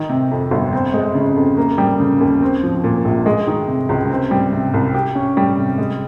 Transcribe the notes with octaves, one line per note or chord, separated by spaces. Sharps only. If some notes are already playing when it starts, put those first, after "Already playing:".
Already playing: D#3
C3
F2
G1
C4
G#3
C#3
F2
A#3
G3
C#3
D#2
C4
F3
A#2
A#1
G#3
D#3
C3
C#2
C4
G3
C3
C2
G4
C#4
G3
C3
G#3